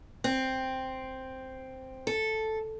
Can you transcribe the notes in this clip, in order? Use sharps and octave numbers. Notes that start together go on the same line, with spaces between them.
C4
A4